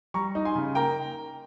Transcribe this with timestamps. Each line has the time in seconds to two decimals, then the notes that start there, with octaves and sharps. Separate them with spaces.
0.14 G3 A#5 C#6
0.35 D#4
0.45 G#5 C6
0.55 C#3
0.75 A#3 G5 A#5